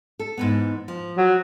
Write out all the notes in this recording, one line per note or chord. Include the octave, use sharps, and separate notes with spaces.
A4
G#2 E3 B3
F3
F#3